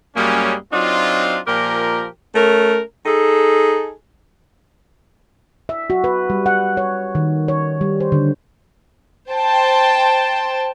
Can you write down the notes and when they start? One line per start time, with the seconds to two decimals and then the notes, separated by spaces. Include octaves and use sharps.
0.16 F#2 G3 G#3 A#3 C#4
0.73 F#3 C4 D4 D#4 F4
1.47 A#2 F3 G4 A#4
2.35 A3 C#4 A#4
3.06 D#4 G#4 A4
5.69 E5
5.90 F#4
6.04 B4
6.30 G3
6.46 F#5
6.77 C#5
7.15 D#3
7.48 C#5
7.81 G3
8.00 C5
8.12 D3
9.30 C5 G5 A5